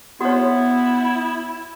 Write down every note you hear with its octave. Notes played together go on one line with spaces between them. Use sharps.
B3 E4 F#4 C#5